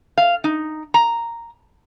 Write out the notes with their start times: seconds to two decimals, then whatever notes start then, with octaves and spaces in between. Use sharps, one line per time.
0.18 F5
0.44 D#4
0.94 A#5